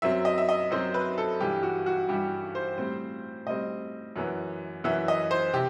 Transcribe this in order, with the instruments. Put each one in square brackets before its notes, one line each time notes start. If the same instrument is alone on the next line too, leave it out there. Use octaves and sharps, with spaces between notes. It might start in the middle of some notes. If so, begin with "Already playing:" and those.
[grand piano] F#2 F#3 C4 E5
D#5
E5
D#5
F#2 F#3 C4 C5
B4
A4
G2 E3 G3 G4
F#4
F#4
G2 E3 G3 G4
C5
A2 G3 C4
A2 G3 C4 D#5
F#2 E3 B3
F#2 E3 B3 E5
D#5
C5
C3 G4